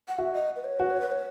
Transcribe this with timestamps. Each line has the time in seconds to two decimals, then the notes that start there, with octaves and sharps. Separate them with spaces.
0.08 F#5
0.18 F#4 E5
0.34 D#5
0.56 B4
0.64 C#5
0.79 F#4 B4
0.90 C#5
1.01 B4
1.12 C#5